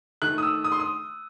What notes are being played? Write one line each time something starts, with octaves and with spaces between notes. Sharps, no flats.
D#3 A3 F#6
D#6
E6
D#6
C6
D#6